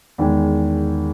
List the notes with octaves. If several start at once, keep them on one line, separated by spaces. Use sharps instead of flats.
E2 D#3 G#3